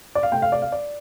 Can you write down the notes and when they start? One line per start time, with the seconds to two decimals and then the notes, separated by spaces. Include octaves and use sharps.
0.15 D5
0.23 F5
0.32 C3 A3 C4 G5
0.42 F5
0.52 D5
0.62 F5
0.72 D5